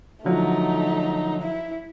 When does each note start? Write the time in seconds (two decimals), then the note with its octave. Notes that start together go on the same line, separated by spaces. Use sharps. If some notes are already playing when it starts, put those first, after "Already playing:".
0.24 D3 F3 F#3 A3 D#4
1.42 E4